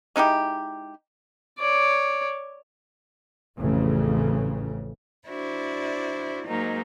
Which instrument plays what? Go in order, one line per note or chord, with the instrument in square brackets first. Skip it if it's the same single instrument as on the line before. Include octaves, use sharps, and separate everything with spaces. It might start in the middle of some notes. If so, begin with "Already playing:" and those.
[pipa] G#3 D#4 E4 G4
[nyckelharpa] C#5 D5
[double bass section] A1 F2 C#3
[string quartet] D4 E4 F#4 C5 D5
G#2 F#3 A#3 D#4